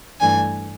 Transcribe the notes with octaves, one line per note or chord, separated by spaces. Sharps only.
G2 E3 A3 D4 G#5